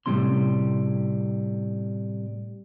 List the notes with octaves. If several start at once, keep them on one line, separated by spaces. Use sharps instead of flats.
A2 C3 G3 A3 C#4 C6